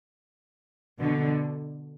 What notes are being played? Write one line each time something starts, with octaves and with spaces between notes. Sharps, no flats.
B2 D3